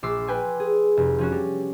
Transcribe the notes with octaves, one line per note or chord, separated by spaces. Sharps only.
A#1 C6 D6 E6 C7
B4 G5 G#5 C6
G#4
F1
F3 C#4 F#4
G3